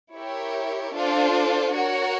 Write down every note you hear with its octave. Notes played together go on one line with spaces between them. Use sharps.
E4 G4 A#4 C#5 E5
D4 F4 A4 C5
F#4 A#4 C#5 F#5